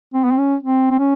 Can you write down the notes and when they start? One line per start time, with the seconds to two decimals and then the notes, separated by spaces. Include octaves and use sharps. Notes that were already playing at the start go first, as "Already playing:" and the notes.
0.14 C4
0.24 B3
0.31 C4
0.38 C#4
0.63 C4
0.90 C4
0.99 C#4